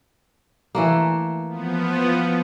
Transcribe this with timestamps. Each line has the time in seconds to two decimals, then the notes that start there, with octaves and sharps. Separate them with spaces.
0.75 E3 A3 A#3
1.48 F3 B3